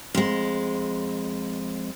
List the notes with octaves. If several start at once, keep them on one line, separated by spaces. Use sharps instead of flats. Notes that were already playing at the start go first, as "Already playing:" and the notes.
F2 G#3